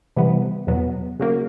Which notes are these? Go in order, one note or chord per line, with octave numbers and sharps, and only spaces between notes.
C3 E3 G3 B3
E2 B2 F#3 B3
C#3 F#3 A#3